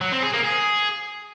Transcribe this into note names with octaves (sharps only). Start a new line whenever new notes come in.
F#3
C4
G#4
A#3
G#4